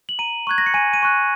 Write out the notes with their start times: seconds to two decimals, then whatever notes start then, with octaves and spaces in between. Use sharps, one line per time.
0.09 F#7
0.19 A#5 D#7
0.47 C#6 F#6 G#6
0.58 A#6
0.66 C#7
0.74 G#5 D#7
0.94 D#7
1.03 C#6 F#6